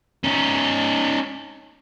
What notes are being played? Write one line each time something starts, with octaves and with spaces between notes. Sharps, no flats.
C#4 D#4